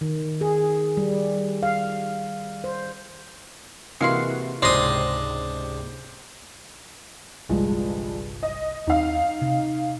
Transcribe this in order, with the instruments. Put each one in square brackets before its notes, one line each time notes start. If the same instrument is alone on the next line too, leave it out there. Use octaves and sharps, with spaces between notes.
[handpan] D#3
G#4
G3
F5
C5
[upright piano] C3 E3 A#3 [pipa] G#3 F5 C6 [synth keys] F#4
[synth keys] C#2 G#2 C3 [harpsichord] D4 D#6 [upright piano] C5 A#6 [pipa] C6
[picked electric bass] G1 C2 [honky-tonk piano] G2 F3 G#3
[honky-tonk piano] D#5
[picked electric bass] D#2 C4 [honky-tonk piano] D#4 F5
[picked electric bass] C3